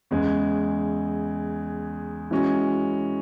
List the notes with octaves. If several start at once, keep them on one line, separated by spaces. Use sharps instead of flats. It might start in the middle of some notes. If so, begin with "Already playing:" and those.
E2 C#3 G#3
E3 G#3 C#4 F#4